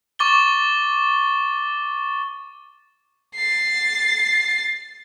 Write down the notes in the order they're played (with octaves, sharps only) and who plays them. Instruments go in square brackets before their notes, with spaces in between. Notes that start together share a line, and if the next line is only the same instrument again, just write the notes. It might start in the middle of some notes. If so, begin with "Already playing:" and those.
[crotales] C#6 D6 A6 G7
[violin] A6 C7